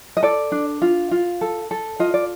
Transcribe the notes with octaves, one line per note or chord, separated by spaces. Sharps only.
D#5
A4 D5
D4
F4
F4
A4
A4
F4 D#5
D5